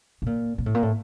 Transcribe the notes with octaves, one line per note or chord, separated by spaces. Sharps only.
B2
A#2
A#2
A2
A#2
A2